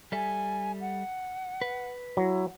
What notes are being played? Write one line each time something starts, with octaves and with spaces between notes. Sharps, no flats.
G3 A4 E5 G#5
F#5
B4
F#3 E4